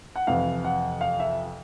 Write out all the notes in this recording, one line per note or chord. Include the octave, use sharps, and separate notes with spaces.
F#5
F2 C3 E3 F5
F#5
F5
E5